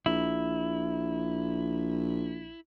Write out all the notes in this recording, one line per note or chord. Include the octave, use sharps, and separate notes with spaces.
A#1 E4